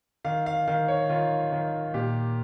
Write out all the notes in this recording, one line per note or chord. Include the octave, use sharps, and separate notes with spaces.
D#3 F5
F5
D#3 F5
C#5
D#3 F4
D#3
A#2 G4